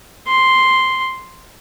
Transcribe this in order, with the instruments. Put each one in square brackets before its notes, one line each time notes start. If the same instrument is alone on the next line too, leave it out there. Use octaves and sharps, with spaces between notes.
[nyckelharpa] C6